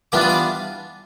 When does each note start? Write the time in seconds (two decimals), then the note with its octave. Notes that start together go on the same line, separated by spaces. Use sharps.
0.12 E3 G3 B3 D4 F4 D6
0.21 D#6
0.29 D6